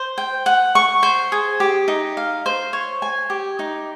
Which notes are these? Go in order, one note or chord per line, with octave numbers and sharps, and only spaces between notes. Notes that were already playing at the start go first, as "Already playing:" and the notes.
Already playing: C5
G5
F#5
C#6
C5
G#4
G4
D#4
F5
C5
C#5
G#5
G4
D#4